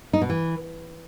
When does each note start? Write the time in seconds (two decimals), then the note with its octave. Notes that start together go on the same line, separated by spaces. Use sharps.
0.13 D#4
0.21 B2
0.30 E3